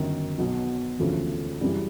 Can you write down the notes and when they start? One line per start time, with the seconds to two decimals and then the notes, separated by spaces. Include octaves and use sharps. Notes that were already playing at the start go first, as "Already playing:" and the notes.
Already playing: G1 F#2 D#3
0.38 B1 B2 F#3
0.99 E1 D2 C#3 F3 A3
1.61 F#2 C#3 E3 G3